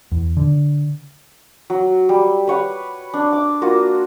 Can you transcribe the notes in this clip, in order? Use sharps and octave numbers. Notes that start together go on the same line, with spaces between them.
E2
D3
F#3
G3
B4 C#5 F#5
D4
D6
A#3 F4 F#4